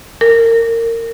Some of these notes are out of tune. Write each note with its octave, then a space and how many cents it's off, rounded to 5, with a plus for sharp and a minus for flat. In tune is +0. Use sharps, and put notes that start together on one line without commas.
A#4 -25